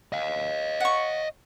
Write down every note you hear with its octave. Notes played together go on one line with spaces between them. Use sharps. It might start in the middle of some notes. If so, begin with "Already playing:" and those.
D#5 F5
F#5 C#6